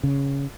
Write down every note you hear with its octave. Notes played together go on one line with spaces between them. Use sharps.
C#3